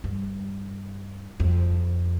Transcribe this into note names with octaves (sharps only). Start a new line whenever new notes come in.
G2
F2